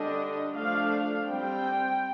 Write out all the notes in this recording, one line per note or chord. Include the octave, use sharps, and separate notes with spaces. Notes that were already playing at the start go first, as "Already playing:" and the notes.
Already playing: D3 G3 D4 D#5
F3 A3 D4 F5
G3 C4 G5